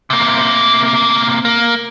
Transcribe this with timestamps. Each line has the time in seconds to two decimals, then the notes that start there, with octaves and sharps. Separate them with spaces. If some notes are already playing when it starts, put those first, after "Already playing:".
0.10 C3 A#3
1.45 A#3